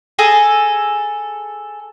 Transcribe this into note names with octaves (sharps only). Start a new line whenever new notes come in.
G#4 A4 A#5